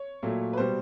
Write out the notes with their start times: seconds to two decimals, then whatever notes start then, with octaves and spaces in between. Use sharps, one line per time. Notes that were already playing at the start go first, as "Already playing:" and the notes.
Already playing: C#5
0.23 A#2 F#3 A3
0.53 B4
0.57 B2 G3 C5